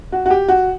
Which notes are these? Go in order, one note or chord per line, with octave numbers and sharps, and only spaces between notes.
F#4
F#4
G4
F#4